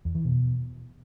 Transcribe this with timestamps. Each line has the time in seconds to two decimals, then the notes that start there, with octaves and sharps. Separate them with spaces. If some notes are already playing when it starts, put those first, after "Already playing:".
0.05 E2
0.15 E3
0.25 B2